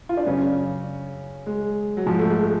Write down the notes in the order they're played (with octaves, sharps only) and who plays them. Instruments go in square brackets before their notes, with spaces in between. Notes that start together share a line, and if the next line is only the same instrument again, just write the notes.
[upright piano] F4
D4
F#2 C#3 C#4
G#3
F#3
G#2 F3
A3
G#3